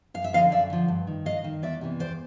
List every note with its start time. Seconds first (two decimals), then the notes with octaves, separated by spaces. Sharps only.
0.14 F#2 F5
0.24 E5
0.33 D3 F3 D#5 F5
0.51 F#2 D5 E5
0.70 D3 F3
0.88 G2
1.07 D#3
1.26 G2 D#5 F5
1.44 D#3
1.62 E2 D5 E5
1.81 C3 E3
1.99 E2 C5 D5